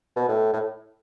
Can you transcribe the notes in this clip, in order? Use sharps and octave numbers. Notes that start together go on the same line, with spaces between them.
B2
A2
A2